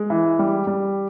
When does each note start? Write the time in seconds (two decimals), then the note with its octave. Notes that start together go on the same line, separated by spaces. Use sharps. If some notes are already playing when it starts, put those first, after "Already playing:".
Already playing: G#3
0.10 E3
0.39 G3
0.67 G3